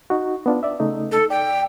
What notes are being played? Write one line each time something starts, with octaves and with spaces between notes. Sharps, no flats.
D#4 F#4
B3 D4 F4
D5 E5
C#3 A3 D#4
A4
D5 G5